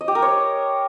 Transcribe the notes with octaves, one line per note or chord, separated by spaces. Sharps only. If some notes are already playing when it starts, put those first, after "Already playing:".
D#5
G4
A#4
C#5